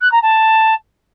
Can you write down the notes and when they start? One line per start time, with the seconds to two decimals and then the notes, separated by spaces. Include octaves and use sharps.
0.01 F#6
0.12 A#5
0.22 A5